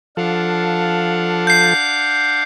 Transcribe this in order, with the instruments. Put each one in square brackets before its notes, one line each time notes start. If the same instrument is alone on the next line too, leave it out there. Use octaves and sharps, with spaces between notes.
[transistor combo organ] F3 A4 [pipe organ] D4 F5 F#5
[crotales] G6 C7